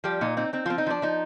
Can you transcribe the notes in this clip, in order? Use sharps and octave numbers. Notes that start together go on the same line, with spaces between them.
F3 G3 G4
A#2 D#4
C4 D#4
C4 D#4
F3 C4 F4
D#4
F3 D4
F3 D#4